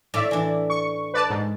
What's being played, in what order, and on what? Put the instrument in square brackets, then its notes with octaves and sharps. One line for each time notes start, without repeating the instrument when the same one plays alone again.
[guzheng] A2 [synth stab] D5 E5
[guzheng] E3 D4
[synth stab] C#6
B4 D5 A5
G#2